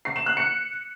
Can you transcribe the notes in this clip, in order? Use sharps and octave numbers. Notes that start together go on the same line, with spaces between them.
C7
E7
F#6
C#7